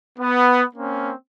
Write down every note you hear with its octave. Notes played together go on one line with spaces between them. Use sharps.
B3
A#3 C4 C#4